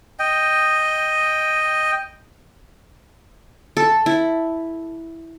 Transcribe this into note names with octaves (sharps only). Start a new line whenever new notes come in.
D#5 G5
A4
E4